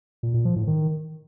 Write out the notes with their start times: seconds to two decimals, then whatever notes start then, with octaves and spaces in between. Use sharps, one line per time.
0.23 A#2
0.34 A#2
0.45 F3
0.56 A2
0.67 D#3